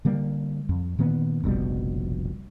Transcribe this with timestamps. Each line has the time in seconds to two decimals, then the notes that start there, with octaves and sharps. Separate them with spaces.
0.05 D3 G3 A#3
0.69 F2
0.99 A#2 D#3 A#3 B3
1.44 F1 A#1 B2 G3